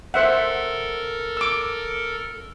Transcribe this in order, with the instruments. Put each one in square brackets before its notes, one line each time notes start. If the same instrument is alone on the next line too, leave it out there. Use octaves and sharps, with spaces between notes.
[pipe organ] A4 A#4 [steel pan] C5 E5 F#5
[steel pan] D6 E6